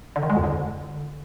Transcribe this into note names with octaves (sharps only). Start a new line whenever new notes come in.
D3
D#3
G#3
F2
D3